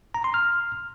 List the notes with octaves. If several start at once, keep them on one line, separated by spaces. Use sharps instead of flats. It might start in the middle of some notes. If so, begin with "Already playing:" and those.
A#5
C6
F6